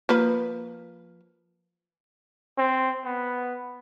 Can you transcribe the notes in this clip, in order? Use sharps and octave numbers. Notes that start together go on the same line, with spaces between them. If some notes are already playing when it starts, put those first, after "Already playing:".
F3 A#3 B4
C4
B3